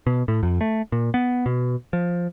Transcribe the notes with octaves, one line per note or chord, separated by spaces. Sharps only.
B2
A2
F2
A3
A#2
B3
B2
F3